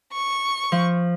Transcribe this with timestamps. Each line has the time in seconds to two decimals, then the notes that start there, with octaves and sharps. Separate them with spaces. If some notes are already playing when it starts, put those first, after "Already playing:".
0.13 C#6
0.72 F3